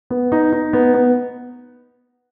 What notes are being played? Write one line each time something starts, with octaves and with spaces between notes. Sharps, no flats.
B3
D#4
D#4
B3
B3